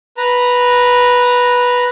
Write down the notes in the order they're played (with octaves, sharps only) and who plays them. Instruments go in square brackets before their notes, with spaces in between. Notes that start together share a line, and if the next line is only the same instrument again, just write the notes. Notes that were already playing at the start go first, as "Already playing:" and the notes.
[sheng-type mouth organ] B4 A#5